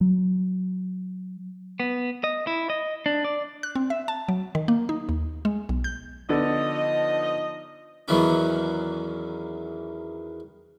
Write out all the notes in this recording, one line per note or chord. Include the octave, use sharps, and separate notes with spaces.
F#3
B3
D#5
E4
D#5
D4
D5
F#6
C4
E5
A5
F#3
D#3
A#3
D#4
D#2
G#3
B1
G6
D3 F3 B3 D4 D#4 D#5
E2 D#3 E3 F#3 B3 C#4